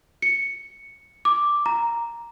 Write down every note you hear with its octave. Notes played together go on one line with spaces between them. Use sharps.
C#7
D6
A#5